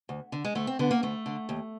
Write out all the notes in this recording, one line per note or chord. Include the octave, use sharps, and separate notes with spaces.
D2
D3
G#3
D2 A3
C4
D3 B3
A#3
D2 A3
D3
D#2